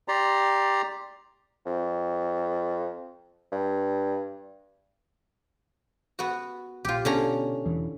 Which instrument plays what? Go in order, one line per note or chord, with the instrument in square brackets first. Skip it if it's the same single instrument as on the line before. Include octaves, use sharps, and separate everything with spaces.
[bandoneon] G4 D5 A#5 C6
[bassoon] F2
G2
[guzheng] B3 F#4
[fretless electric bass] A#1 [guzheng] F4 G4
[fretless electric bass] B2 [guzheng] D3 C#4 A#5
[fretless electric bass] E1 E2 E3